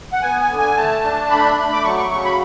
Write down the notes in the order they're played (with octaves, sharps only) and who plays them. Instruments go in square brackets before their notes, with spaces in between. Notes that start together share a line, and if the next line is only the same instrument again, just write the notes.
[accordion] F#5
B3 G#5
G#5
D3
G#5
A3 A5
D4
A3 B5
A3
D6
F#3 C#6
C#6
C#3 C#6
B5